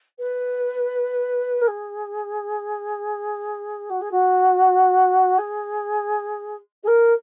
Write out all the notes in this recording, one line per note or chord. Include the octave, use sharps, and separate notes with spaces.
B4
A#4
G#4
F#4
G#4
F#4
G#4
G#4
A#4